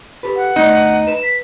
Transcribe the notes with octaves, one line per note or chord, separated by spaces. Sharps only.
G4 A4 B4
F#5
D2 A3 B3 D#4
B4 A#5 E7
B6